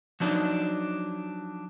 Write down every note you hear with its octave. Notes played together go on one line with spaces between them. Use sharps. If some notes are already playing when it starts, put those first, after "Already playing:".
F3 F#3 D4 D#4